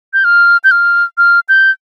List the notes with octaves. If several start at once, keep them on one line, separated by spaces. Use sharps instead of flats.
G6
F6
G6
F6
F6
G6